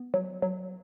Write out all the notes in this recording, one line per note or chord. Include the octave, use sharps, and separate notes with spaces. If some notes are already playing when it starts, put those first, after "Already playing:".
Already playing: B3
F#3
F#3